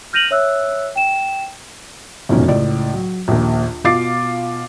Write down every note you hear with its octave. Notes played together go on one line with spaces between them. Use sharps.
F6 G6 A#6 D#7 F7 F#7
C#5 E5 E6 F#6
G5 E7
F1 B1 F#2 A#2 D#3 C#4
C#2 A2 D5
F#3
A#1 D#2
B2 F4 D6 A6 C7